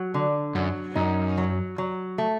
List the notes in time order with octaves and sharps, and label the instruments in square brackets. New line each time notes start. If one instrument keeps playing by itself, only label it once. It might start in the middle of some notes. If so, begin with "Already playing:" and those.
Already playing: [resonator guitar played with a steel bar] F#3
D3
[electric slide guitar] F#2 [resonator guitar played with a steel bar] F#3
[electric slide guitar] F#2 [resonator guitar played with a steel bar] D#4
[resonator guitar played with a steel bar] F#3
F#3
A3